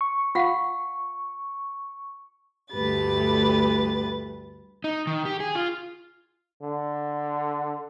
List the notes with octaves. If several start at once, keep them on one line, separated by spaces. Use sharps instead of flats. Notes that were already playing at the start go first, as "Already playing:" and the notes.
C#6
F4 F5 F#5
D2 G2 A3 G4 B4 A6
D#4
D#3
G4
G#4
F4
D3